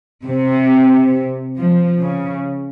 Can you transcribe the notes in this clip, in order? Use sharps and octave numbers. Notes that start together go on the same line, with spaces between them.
C3
F3
C#3